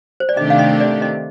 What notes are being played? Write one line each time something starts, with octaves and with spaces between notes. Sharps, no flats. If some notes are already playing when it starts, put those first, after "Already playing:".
C5
D5
C3 D#3 A3 D4 G4 D#5
F5
D#5
D5
D#5